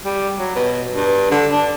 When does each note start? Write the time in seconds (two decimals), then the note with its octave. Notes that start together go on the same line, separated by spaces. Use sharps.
0.05 G3
0.39 F#3
0.56 B2
0.94 G2
1.31 D3
1.52 D4